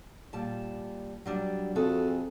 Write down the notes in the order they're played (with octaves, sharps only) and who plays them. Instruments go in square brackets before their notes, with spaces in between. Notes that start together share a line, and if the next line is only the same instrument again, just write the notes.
[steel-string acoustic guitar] A#2 G3 A5
F#3 G3 D4
[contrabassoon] F2 [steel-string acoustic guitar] F#4 G#4 A4